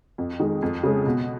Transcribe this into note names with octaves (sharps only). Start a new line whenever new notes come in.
F2
D#3 G#3
F2
C#3 G#3
B2